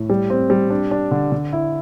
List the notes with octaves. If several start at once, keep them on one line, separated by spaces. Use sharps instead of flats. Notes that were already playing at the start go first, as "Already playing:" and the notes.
Already playing: A2
G3
C4
G3
D4
D4
D3
D3
E4